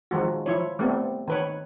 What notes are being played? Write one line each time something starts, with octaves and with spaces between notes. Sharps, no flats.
D#3 F3 G#3 F#4
F3 E4 C#5
G3 A3 B3 C4
D#3 B4 C#5